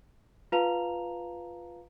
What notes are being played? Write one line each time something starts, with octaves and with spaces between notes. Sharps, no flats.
F4 B4 F5 A5 A#5 F7